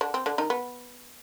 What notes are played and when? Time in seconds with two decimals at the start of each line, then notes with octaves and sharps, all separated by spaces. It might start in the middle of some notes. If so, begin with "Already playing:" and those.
0.01 D3 D4
0.14 C4
0.26 D3 D4
0.38 D#3 D#4
0.50 B3